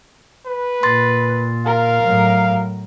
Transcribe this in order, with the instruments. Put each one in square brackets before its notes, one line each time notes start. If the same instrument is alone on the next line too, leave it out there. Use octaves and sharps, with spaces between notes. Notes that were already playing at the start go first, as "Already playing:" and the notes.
[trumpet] B4
[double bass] A#2 [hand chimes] C6 A6
[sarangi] A#4 [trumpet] F5
[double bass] A2 F#3